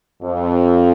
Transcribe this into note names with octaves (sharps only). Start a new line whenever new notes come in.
F2